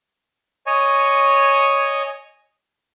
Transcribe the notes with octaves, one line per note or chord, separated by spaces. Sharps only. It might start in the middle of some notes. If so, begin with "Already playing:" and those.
C#5 D#5 G#5 C#6